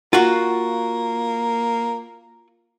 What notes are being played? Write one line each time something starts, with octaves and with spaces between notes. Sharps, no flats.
A#3 F4 F#4